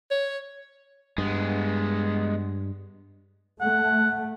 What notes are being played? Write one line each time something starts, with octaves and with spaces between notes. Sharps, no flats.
C#5
G2 G#3 B3
A3 F#5